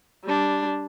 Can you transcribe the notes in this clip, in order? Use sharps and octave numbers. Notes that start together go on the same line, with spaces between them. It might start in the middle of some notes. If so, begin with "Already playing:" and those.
G3 D4